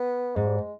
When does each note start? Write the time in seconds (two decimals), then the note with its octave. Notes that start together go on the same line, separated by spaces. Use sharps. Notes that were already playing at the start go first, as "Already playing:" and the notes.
Already playing: B3
0.36 G#2 G#3
0.46 G3
0.57 G#3